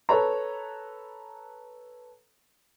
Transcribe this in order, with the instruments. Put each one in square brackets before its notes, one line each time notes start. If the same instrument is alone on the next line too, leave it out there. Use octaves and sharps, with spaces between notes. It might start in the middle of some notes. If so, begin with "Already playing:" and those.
[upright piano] A4 B4 C#5 A#5